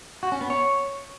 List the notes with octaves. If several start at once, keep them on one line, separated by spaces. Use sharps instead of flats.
F#4
C#4
B3
C#5